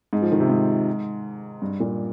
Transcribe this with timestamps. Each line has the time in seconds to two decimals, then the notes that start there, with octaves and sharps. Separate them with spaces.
0.13 G#2
0.22 F3
0.32 D#3
0.40 C3
0.49 G#2
1.62 G2
1.80 A#2